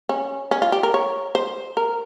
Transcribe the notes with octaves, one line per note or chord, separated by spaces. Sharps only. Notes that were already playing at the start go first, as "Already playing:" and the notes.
C#4
C#4
F4
G4
A#4
C#5
C5
A#4